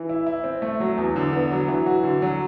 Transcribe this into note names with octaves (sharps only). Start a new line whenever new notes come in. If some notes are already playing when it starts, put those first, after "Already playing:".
Already playing: E3
E4
E4
C4
A3
F#3
E2
D3
B3
F#3
E3
F#4
D3
F#3